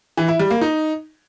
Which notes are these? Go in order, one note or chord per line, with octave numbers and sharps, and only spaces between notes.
E3
E4
G3
A#3
D#4